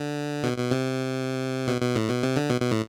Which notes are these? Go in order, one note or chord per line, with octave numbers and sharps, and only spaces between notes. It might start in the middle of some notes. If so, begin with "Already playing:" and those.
Already playing: D3
B2
B2
C3
B2
B2
A2
B2
C3
D3
B2
B2
A2